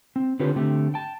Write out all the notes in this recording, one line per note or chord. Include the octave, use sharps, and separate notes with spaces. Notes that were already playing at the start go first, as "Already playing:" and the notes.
C4
D3 C4 F4 G4 B4 C#5
D3 A3 C4 G4
G5 A5